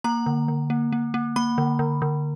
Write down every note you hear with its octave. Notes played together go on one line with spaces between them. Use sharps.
A#3 A#5
D3
D3
A#3
A#3
A#3
A#3 B5
D3
D3
D3